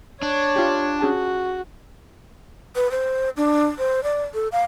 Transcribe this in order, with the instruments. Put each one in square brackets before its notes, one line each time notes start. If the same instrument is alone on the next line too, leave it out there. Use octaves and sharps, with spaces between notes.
[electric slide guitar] D4 [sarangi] C#5
[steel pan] F4 G4
[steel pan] C#4 G#4 A5 [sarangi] F#4
[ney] B4
C5
D4
C5
D5
A4
F5